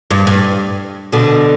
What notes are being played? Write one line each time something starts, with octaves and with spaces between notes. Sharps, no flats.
G2
G2
B2 D3